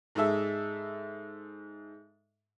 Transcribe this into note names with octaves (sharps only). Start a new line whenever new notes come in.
G#2 G#3 A4 E5